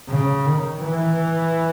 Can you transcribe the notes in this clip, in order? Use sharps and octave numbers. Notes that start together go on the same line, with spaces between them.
C#3
D#3
E3